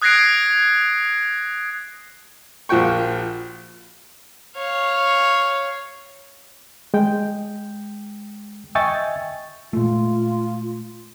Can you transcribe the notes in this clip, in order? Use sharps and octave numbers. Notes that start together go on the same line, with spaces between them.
D#6 F#6 G#6 A#6 C7 D7
A#1 F3 F#4 G5 C#6
C#5 F5
G#3 G5
D#5 E5 G5 G#5 C#6 A6
A#2 G#3 A3 F4